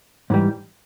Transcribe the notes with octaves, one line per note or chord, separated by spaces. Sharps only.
G#2 E3 G3